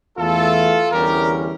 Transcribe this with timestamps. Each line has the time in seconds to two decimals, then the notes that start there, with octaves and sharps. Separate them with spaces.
0.17 E2 E3 A3 E4 F4 A4
0.92 E2 D3 G3 C#4 E4 G4 A#4